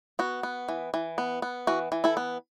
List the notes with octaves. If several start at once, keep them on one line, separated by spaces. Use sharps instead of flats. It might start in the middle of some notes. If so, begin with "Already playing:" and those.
B3 F#4
B3
E3
E3
B3
B3
E3 F#4
E3
E4 A4
B3